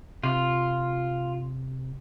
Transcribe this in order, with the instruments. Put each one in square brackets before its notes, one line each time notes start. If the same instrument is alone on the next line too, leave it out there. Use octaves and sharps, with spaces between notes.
[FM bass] C3 [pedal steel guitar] F4